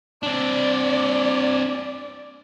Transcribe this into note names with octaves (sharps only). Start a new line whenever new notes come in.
C4 D4 D5